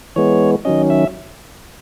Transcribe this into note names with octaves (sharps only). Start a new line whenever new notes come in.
E3 G#3 B3 C#5
D#3 F#3 C#4 D#5
E5